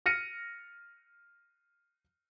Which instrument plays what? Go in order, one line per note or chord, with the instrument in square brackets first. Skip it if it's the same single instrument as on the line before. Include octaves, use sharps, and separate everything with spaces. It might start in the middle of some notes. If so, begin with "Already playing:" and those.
[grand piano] F6 A#6 C#7 D#7